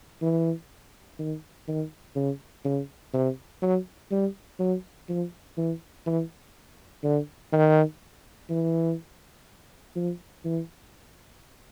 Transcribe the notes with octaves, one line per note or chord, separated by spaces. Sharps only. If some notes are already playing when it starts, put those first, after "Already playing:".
E3
D#3
D#3
C#3
C#3
C3
F#3
G3
F#3
F3
E3
E3
D3
D#3
E3
F3
E3